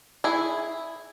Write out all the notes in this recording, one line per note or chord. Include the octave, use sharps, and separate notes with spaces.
E4 G#4